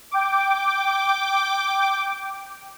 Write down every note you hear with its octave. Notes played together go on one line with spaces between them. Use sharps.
G5 D6